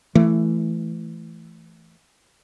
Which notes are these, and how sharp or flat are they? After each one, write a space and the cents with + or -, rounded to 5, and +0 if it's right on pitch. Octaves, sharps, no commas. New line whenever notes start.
E3 +10 A3 +0